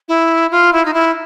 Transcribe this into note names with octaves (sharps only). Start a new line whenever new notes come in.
E4
F4
E4
D#4
E4